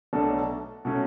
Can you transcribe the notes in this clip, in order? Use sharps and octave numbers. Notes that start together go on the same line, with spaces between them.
B1 B2 A3 D4 A4
B2 F#3 A3 C#4